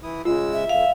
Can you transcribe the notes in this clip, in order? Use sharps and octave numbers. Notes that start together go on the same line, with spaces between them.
E3 E4 D#6
C#3 G#3 F4 E6
E5
F2 F5